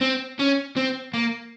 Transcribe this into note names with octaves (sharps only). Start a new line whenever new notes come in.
C4
C#4
C4
A#3